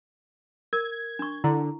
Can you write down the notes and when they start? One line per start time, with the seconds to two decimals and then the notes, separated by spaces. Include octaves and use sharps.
0.73 A#4 G#6
1.19 D4 C#6
1.44 D3 E4